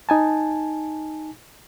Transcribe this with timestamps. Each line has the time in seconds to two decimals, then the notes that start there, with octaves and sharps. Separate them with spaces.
0.09 D#4 G#5 A5